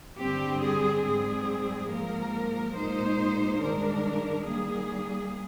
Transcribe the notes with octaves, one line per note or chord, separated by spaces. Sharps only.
G2 D3 G3 C4 G4
G#4
G#2 G3 C4 G#4
G#2 F3 A#3 A#4
A#2 G#3 D#4 C5
G2 D#3 G#3 D4 A#4
D#3 G3 A#3 G#4